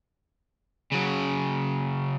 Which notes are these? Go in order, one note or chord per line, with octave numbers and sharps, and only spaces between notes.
C#3 F#3